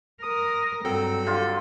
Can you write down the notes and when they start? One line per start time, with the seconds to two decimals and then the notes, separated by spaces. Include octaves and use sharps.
0.23 A#4 D#6
0.85 G2 F#3 C4 A4
1.26 D3 F4 G4